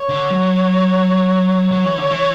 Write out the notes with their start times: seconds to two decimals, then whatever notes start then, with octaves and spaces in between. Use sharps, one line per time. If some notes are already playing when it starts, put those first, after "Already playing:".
Already playing: C#5
0.09 D3
0.30 F#3
1.72 F#3 C#5
1.85 E3
1.98 D3
2.10 E3